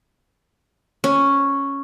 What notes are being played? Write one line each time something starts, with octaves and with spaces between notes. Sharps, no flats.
C#4